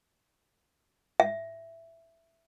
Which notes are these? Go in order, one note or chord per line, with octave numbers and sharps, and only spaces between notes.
E5